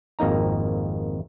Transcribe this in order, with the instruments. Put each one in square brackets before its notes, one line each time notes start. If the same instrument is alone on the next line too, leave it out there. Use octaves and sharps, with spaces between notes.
[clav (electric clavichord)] G#1 F2 A#3 D#4 A#5